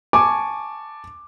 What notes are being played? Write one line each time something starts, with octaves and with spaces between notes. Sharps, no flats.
G#5 A5 C#6 D6